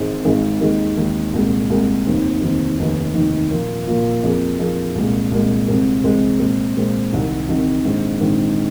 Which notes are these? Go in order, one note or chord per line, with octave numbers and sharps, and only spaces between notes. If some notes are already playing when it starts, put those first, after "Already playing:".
Already playing: G#1 G#2 G#3 C4 G#4
G#1 G#2 G#3 C4 G#4
D#2 D#3 G#3
D#2 D#3 G#3
C2 A#2 G#3
C2 A#2 G#3
F1 D#2 D#3 C4
F1 D#2 D#3 C4
F1 D#2 D#3
F1 D#2 D#3
A#2 F3 A#3 F4
A#2 F3 A#3 F4
F2 F3 A#3 G#4
F2 F3 A#3 G#4
C2 A#2 G#3
C2 A#2 G#3
C2 C3 G#3 C4
C2 C3 G#3 C4
A#2 G#3 C4
A#2 G#3 C4
C2 C3 D#3
C2 C3 D#3
A#1 G#2 D#3 C4
A#1 G#2 D#3 C4